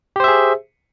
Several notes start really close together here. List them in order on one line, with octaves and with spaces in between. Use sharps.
G4 C5 E5 G#4